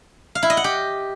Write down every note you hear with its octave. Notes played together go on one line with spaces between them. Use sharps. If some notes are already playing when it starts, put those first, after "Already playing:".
F5
E4
D#5
F#5
G4